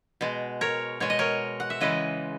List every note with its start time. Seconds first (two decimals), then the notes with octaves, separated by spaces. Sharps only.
0.21 B2 G#3
0.61 A#4 C#5
1.00 B2 G#3 C#5
1.10 D#5
1.19 A#4 C#5
1.60 F#5
1.70 E5
1.81 C#3 E3 G#3 B4 D#5